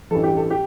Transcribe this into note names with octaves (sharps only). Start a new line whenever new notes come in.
A1 G2 E3 A4
G4
A4
G4